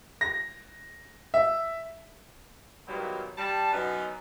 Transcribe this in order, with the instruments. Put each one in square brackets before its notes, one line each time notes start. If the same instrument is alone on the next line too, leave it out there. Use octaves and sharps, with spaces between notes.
[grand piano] A#6
E5
[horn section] A#2 D#3 F#3 G3 A#3 B3
G3 A5
F#2 B2 F#3 B3 D#4